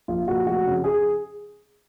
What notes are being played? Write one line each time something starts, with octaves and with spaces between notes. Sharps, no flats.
A#1 F4
A#2 F3 F#4
F1 F#4
F2 C#3 F3
G#4